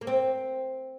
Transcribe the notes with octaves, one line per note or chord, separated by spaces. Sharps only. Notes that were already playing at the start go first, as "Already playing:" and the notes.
A#3
C4